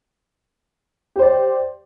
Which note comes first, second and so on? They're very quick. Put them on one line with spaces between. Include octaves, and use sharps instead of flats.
G4 C5 D5